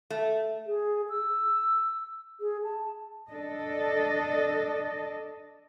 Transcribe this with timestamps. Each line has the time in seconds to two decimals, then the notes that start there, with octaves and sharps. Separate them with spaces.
0.10 A3
0.67 G#4
1.10 E6
2.40 G#4
2.64 A5
3.28 D4 A4 D#5